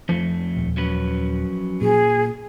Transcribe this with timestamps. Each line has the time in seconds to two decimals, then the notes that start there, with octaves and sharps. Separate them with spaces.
0.09 F2 F3 A3
0.56 D#1
0.77 F#3 C#4 B4
1.81 A#2 G#4